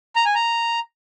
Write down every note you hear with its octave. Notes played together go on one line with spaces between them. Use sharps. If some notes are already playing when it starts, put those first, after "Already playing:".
A#5
G#5
A#5